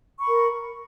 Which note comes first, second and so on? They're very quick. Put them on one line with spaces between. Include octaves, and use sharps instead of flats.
C#6 B5 A#4